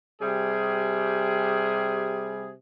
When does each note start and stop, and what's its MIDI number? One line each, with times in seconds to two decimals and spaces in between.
0.21 2.53 48
0.21 2.53 55
0.21 2.53 68